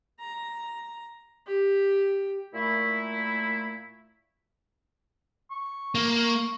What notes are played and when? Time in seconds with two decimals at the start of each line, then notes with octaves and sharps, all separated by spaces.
0.20 A#5
1.46 G4
2.54 A#2 A3 E4
5.51 C#6
5.95 A#3
6.24 C#6